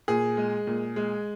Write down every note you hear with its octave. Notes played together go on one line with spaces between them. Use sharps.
A#2 G#4
G#3
A#2
G#3